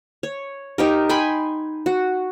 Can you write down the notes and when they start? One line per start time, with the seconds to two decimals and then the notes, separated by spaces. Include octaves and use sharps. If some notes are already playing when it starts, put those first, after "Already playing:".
0.23 C#5
0.78 D#4 G4 A#4
1.09 G5 G#5 B5 C6
1.86 F#4